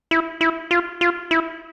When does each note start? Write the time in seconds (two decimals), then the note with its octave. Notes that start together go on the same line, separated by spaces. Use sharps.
0.11 E4
0.41 E4
0.71 F4
1.01 F4
1.31 E4